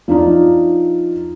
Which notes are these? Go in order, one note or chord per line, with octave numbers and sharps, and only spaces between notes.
F3 D4 D#4 F4